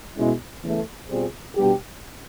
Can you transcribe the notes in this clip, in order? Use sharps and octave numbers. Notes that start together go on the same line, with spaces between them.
B2 G#3 C#4 E4
E2 C#3 E3 A3
B2 G3 C4 F4 G#4
B2 G3 B3 D4 G4